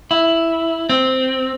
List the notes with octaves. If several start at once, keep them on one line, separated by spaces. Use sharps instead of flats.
E4
C4